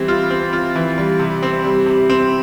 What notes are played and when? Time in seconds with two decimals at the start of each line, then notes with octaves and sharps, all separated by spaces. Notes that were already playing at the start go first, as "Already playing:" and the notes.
Already playing: E3 G3 C4
0.08 F4
0.30 C4
0.53 F4
0.75 E3
0.98 G3
1.20 C3
1.43 C4
1.64 G3
1.86 C3
2.10 C4